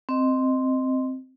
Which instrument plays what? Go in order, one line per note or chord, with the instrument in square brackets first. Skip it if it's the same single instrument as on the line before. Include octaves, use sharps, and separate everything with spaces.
[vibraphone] C4 D#5